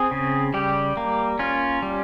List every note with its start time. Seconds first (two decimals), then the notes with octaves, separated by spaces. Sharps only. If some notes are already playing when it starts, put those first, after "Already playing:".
Already playing: C4 G#4
0.11 C#3
0.54 G3 G4
0.97 A#3
1.39 C#4 F4
1.82 G3